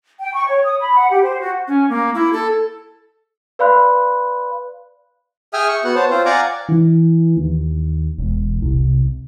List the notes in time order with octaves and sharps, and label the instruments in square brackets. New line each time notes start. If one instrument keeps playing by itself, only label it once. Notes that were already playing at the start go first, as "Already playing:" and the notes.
[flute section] G5
C#6
C#5
D#6
B5
F#5
G4
C5
F#4
[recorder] C#4
A#3
E4
A4
[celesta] B4 D5 F5 B5 C6 F#6
[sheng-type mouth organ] G#4 E5 G5 G#5 D#6 F6
C#6
B3 F#4 F#5
C5 C#5 A5
C4 F4 C5
D5 F5 F#5 G#5 A#5 D6
[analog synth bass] E3
D#2
E1
C2